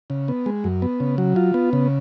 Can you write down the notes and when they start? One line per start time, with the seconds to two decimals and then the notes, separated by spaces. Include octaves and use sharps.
0.10 C#3
0.28 B3
0.46 G#3
0.64 F#2
0.82 B3
1.00 C#3
1.18 F#3
1.36 F4
1.54 B3
1.73 C#3